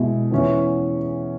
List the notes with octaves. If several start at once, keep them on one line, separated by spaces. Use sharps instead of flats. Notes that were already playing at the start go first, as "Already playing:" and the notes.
Already playing: B2 G#3 E4
E2 E3 C#4 E4